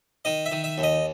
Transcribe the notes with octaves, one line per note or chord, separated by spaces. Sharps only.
D#3 D#5
E5
D#3
E5
D#2
D#5